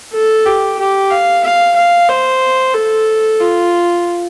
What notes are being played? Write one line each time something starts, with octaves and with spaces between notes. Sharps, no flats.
A4
G4
G4
F5
F5
F5
C5
A4
F4